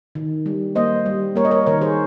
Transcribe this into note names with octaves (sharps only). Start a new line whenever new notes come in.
D#3
G3
A#3 C5 D#5
G3
A#3 A#4 C#5
D#5
A#4 C#5
D#3 A#4 C#5
G#4 C5